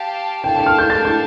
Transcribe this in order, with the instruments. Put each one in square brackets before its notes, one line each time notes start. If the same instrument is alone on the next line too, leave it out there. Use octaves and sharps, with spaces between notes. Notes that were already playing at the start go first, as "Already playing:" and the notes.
Already playing: [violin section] G4 F5 A5
[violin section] D4 A4 F5 A5 [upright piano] G5
[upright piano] G5
F6
G6
A6
G6